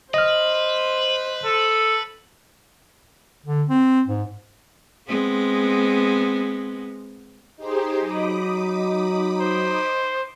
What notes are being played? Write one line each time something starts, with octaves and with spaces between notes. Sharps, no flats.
B4 C5 D#5 F6
A4
D3
C4
G#2
G#3 B3 C4
D#4 G4 G#4 C5
F#3 B5 D6 D#6
C5